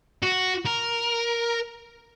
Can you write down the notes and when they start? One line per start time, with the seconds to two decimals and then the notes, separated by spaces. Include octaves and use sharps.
0.23 F#4
0.66 A#4